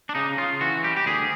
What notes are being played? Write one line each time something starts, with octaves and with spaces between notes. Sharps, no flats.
D4
C#3 D#4
C#3 F4
E3 F#4
G3 G4
G4
D2 G#4